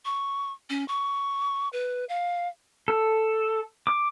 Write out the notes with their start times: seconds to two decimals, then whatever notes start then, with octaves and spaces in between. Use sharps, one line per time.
0.05 C#6
0.70 C#4
0.88 C#6
1.73 B4
2.09 F5
2.88 A4
3.87 D6